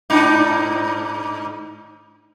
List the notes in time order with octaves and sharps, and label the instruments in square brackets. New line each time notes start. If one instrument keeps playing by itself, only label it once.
[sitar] G#2 D4 D#4